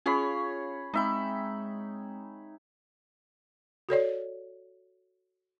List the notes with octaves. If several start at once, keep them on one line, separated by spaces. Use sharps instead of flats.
C#4 F4 G#4 C#5 F5 B5
G#3 C4 D#4 E5 G5 B5
F#4 A4 C#5 D5